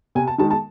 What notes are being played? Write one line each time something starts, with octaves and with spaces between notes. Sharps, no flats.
C3 G#5
A5
D#3 G#3 A5
A5